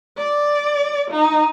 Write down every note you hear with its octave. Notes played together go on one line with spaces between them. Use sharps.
D5
D#4